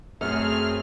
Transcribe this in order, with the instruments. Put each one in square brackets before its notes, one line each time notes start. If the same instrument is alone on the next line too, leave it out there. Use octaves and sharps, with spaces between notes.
[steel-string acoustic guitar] F#2 [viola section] A3 C4 G#4 [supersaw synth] F6